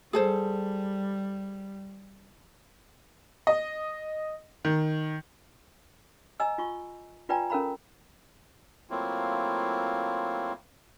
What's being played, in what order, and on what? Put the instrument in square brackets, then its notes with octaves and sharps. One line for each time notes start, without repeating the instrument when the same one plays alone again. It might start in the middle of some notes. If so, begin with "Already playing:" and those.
[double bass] G3 [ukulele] G#4 A4 C5
[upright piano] D#5
D#3
[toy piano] D#5 G#5 A#5 E6
F4 G#5 C#6
F4 B4 D5 G5 G#5 A#5
C#4 A4 A#4 F5 A#5 B5
[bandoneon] F#3 A3 A#3 C4 E4 F4